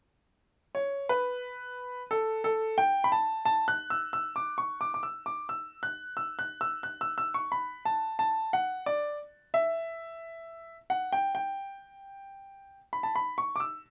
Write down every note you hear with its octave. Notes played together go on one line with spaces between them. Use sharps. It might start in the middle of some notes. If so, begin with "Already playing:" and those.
C#5
B4
A4
A4
G5
B5
A5
A5
F#6
E6
E6
D6
C#6
D6
D6
E6
D6
E6
F#6
E6
F#6
E6
F#6
E6
E6
C#6
B5
A5
A5
F#5
D5
E5
F#5
G5
G5
B5
A5
B5
C#6
D6
E6